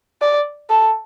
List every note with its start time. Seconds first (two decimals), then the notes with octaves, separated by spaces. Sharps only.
0.21 D5
0.70 A4